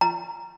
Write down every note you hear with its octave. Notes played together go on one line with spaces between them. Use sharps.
A#5